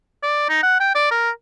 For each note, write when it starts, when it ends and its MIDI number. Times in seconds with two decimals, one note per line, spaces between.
0.23 0.46 74
0.49 0.60 63
0.63 0.80 78
0.80 0.94 79
0.95 1.08 74
1.11 1.30 70